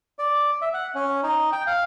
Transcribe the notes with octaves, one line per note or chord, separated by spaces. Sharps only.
D5
E5
F#5
C#4
D#4
G5
F5